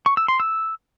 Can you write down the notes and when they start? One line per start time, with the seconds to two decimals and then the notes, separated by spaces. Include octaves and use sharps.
0.06 C#6
0.17 E6
0.28 C6
0.40 E6